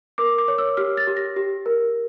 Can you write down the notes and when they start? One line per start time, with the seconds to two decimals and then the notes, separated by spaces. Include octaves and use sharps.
0.18 A#4 D6
0.38 D6
0.48 C#5
0.58 E6
0.77 G4 F6
0.97 A6
1.07 G4
1.17 A#6
1.36 G4
1.66 A#4